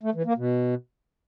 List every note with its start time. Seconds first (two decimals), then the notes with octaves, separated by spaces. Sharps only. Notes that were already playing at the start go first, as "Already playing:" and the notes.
0.03 A3
0.15 E3
0.26 A#3
0.37 B2